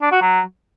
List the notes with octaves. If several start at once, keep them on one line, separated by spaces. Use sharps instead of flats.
D4
F#4
F#3